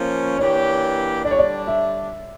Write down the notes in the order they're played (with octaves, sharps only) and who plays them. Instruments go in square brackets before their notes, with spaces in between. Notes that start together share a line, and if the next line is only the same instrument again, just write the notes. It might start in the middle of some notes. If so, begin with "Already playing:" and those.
Already playing: [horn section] F3 A#3 C#4
[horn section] E3 A#3 D4 G4 [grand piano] C#5
[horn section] D3 G3 D4 [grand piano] D5
[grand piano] C#5
D5
E5